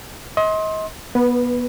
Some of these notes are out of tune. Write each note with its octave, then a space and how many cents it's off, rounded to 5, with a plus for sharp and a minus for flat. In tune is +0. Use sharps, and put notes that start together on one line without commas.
D#5 +35 C6 +20
B3 -25 B4 +0